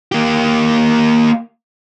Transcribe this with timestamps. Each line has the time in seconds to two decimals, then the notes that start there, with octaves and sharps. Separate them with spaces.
0.12 A#3 G4